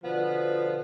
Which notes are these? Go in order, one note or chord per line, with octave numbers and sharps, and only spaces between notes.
B2 D3 F3 B3